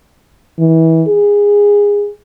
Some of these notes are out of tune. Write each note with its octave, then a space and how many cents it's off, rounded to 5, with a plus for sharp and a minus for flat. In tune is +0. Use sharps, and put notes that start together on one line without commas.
E3 -25
G#4 -20